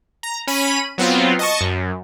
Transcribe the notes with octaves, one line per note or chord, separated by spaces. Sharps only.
A#5
C#4 B5 D#7
F#3 B3 C4 F4
D#5 A5 C#6
F#2